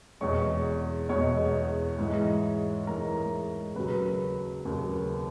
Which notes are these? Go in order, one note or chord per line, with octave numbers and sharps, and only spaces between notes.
E2 B2 G#3 C#5 C#6
E2 B2 G#3 C#5 C#6
G#2 E3 G#3
G#2 E3 G#3 A#4 A#5
D#2 C#3 F#3 B4 B5
D#2 C#3 F#3